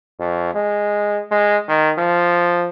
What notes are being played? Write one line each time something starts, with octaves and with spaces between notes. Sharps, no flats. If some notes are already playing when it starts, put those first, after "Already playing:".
F2
G#3
G#3
D#3
F3